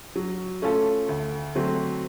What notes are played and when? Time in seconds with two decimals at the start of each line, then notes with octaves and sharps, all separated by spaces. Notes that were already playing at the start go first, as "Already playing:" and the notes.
0.16 F#3
0.62 A3 C#4 F4 A4
1.09 D2
1.55 D3 F#3 A3 C4